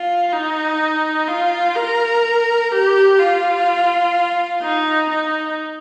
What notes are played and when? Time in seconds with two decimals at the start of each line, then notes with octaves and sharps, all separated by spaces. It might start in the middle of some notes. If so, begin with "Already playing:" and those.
Already playing: F4
0.32 D#4
1.28 F4
1.76 A#4
2.71 G4
3.19 F4
4.63 D#4
5.10 D#4